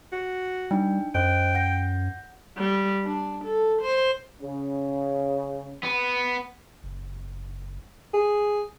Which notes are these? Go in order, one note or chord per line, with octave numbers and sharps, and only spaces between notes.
F#4
G3 D4 D#4 G5
F#2 C5 D#5 G5 F#6
F#5 G6 A#6
G3
D4
A4
C5
C#3
B3
F#1
G#4